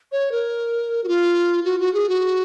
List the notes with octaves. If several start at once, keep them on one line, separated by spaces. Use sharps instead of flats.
C#5
A#4
F#4
F4
F#4
F#4
G#4
F#4